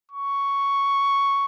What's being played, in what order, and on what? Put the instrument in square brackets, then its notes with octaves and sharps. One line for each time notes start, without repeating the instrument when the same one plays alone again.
[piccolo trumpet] C#6